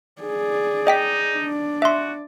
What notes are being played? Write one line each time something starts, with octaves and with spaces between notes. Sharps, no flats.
G#4 D5
D#4 D#5 G5 B6
D4 D5
F#4 E5 C6